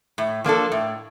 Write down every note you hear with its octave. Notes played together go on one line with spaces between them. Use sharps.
A2
F3 A#3 D4 A4
A2